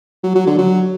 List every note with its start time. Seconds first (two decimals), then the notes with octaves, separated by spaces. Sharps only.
0.24 F#3
0.35 F#3
0.47 D3
0.58 F#3